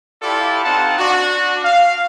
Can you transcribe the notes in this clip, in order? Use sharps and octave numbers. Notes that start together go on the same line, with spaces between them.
E4 F4 G4 A4 D5
C4 D#4 F4 F#5 A5
D4 F#4
F5